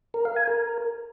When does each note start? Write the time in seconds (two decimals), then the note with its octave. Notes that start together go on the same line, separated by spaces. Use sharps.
0.14 A#4
0.25 F5
0.36 G#5
0.48 A#4